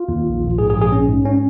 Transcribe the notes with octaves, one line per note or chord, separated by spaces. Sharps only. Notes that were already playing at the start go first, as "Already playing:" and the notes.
Already playing: F4
D#2
A#1
A#1
G#2 G#4
G#4
A#1
G#4
C#4
G#2
C#4